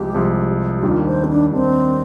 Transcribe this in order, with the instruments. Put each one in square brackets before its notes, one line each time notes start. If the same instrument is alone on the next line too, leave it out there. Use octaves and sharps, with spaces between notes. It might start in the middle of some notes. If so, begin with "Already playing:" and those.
Already playing: [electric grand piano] C2 C3 F3 G#3 [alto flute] G4
[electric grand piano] C2 C3 F3 G#3
[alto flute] G4
[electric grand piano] D#2 D#3 G3 D4 [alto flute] F4
[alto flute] C5
C4
D4
[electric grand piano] D#2 D#3 G3 D4 [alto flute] C4